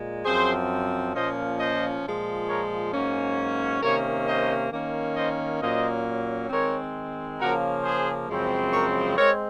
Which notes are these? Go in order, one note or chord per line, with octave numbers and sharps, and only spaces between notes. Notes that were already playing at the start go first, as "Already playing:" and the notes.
Already playing: A#2 G#3
F#2 F3 C4 G#4 C5
A#2 F3 A#3 C#4 C5 D#5
C5 D#5
A#2 F3 G#3
A#4 C#5
G#2 F#3 A#3 C#4
C3 D#3 A#3 C#4 A#4 C#5
C5 D#5
D#3 A#3 C#4
C5 D#5
A#2 F#3 A#3 C#4 C5 D#5
D#3 G#3 C4 A#4 C#5
C#3 F3 A#3 C#4 F#4 A#4
G#4 C5
F#2 C#3 F3 G#3 C4
A#4 C#5
G#3 C4 A#4 C#5